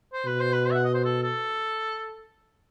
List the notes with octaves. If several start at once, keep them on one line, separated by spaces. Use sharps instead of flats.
C5
B2 B4
C5
B4
C5
E5
F#5
D#5
C5
A4
A4